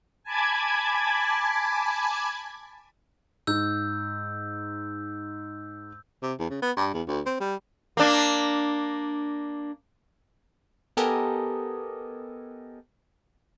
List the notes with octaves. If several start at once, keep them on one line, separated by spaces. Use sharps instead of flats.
G#5 A5 B5 D6 G#6
G#2 E6 G6
C3
E2
C#3
B3
G2
E2
D2
C4
G3
A#3 D4
B3 G4 A4 A#4 D#5 G#5